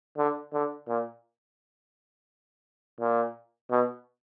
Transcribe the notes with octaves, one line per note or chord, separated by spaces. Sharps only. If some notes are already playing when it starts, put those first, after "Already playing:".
D3
D3
A#2
A#2
B2